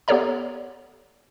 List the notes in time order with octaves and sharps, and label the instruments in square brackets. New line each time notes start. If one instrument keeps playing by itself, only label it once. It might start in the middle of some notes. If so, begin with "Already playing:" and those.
[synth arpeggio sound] B3 G4 A4 C#5 D5 A#5